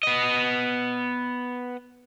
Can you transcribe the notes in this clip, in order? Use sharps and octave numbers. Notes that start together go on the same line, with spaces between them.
B3 D#5